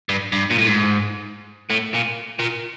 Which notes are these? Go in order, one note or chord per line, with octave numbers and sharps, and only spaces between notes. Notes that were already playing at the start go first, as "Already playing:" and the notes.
G2
G2
A#2
A2
G#2
A2
A#2
A#2